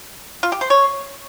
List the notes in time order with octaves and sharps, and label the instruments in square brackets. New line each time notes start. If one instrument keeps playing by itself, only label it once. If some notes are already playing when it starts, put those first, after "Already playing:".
[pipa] F4
G4
C5
C#5